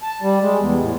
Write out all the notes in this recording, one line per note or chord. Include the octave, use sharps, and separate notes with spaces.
A5
G3
G#3
E2
A2